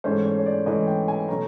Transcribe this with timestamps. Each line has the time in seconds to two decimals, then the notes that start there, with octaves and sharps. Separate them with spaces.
0.04 G#2 E3 A3 C#4 C5
0.25 C#5
0.39 C#5
0.46 D5
0.66 G#2 E3 A3 C#4 D#5
0.87 G5
1.08 G#5
1.28 B2 F#3 A3 C#4 A#5